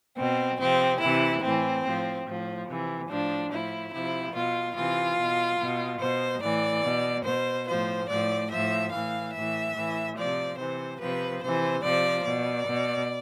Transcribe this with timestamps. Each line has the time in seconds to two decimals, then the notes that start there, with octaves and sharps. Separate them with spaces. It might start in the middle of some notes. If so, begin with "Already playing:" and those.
0.16 B2 C4
0.58 C3 F3 C4
1.00 C3 E3 E4
1.42 A2 E3 C4
1.84 A2 F3
2.25 A2 F3
2.67 C3 E3
3.08 A2 F3 D4
3.50 A2 F3 E4
3.91 C3 F3 E4
4.33 B2 F4
4.74 C3 E3 F4
5.17 B2
5.59 B2
5.99 B2 C5
6.41 A2 E3 D5
6.83 B2
7.24 B2 C5
7.66 A2 F3 C5
8.08 A2 F3 D5
8.49 A2 F3 E5
8.91 A2 E3 F5
9.33 A2 E3 E5
9.74 A2 E3
10.16 C3 F3 D5
10.57 C3 E3 C5
10.99 C3 F3 B4
11.41 C3 E3 C5
11.83 C3 F3 D5
12.25 B2 D5
12.66 B2